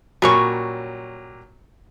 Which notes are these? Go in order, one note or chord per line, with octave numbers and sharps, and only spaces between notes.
A#2 F#3 G3 C#4 C#6